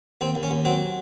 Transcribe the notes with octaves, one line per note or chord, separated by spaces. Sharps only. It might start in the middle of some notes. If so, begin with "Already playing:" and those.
D#2 C4
D#2
C#4
D#2
F#3 C4